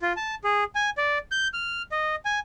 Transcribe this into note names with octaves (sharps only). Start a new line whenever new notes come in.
F4
A5
G#4
G#5
D5
G6
F6
D#5
G#5